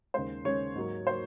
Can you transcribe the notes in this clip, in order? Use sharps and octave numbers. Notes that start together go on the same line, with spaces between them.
D#2 C#3 G#3 C5
D#2 C#3 G#3 C#5
G#2 F#3 A#3
F#3 A#3 C5